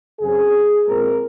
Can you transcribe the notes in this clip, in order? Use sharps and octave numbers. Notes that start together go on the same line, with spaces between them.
F#2 C#3 F#3 C4 G#4
A#2 G#3 C4 A#4